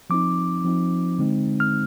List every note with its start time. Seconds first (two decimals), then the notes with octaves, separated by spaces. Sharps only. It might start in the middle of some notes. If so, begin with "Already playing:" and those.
0.10 F3 C4 D#4 D6
0.65 F3 C4 D#4
1.19 D3 G#3 C4 D#4
1.60 F6